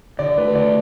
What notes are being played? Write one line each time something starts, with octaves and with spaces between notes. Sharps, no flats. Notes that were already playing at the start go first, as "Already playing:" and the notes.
D3 D5
A3 B4
D3 D5